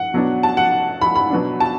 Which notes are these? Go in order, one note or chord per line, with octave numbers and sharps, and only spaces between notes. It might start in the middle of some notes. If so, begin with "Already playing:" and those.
Already playing: F#5
B2 F#3 B3 D4
A5
F#5
B5
B5
B2 F#3 B3 D4
A5